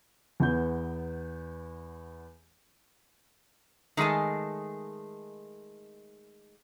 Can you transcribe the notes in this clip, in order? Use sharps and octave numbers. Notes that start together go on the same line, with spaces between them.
E2 B3 G6
D#3 G#3 A3 G#5 A5